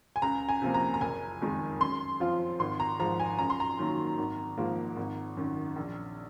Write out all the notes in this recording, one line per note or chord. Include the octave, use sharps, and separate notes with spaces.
G#5
C#2 A#5
G#5
C3 F3 A#3
A#5
A#5
F#1 G#5
F2 D#3 G#3 D#4
F#2 C6
F3 C4 F4
G#1 C6
A#5
G#2 F3 A#5
G#5
F#2 A#5
C6
A#5
D#3 F#3 A#3
G#1
G#2 F3 A#3 F4
G#1
F#2 D#3
A#1